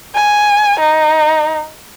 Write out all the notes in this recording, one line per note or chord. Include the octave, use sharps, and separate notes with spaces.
G#5
D#4